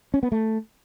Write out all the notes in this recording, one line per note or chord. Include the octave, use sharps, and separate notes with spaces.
C#4
B3
A3